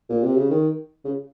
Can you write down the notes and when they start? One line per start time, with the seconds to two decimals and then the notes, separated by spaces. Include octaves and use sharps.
0.10 A#2
0.23 C3
0.36 C#3
0.50 D#3
1.04 C#3